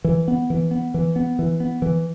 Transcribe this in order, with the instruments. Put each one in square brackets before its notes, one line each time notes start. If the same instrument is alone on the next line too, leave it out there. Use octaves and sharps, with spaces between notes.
[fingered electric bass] E3
B3
E3
B3
E3
B3
E3
B3
E3